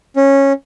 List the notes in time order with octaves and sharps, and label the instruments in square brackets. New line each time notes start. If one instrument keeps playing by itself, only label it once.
[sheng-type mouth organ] C#4